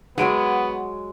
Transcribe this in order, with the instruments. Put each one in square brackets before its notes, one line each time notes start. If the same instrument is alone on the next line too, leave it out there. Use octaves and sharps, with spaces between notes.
[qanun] F#3 G#3 [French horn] B3 [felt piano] F#5 D7